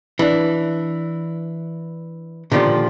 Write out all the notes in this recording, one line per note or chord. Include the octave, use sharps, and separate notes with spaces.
E3 D4
A#2 D3 D#3 F3 G4